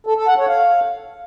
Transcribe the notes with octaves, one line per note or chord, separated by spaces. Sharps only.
A4
A4
F#5
C#5
F5